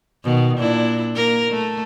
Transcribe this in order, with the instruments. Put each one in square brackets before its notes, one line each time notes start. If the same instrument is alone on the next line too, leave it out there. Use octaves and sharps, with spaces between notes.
[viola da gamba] B2 D#3
A#2 D4 E4
A#3 A#4
A3